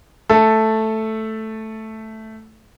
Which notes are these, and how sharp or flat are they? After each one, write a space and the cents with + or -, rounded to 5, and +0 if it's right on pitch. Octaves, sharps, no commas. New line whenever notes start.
A3 +0 A4 +0